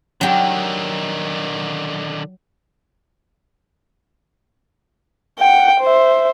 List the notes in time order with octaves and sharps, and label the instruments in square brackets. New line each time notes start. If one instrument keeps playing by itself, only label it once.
[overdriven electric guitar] D3 D#3 [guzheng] F#3 G4
[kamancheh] F#5 G5
C5 E5